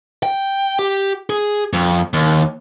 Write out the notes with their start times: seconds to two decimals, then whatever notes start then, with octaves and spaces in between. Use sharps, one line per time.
0.23 G5
0.79 G4
1.30 G#4
1.73 F2
2.14 D#2